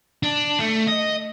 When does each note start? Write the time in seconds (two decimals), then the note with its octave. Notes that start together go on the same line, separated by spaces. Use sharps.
0.23 D4
0.59 A3
0.87 D#5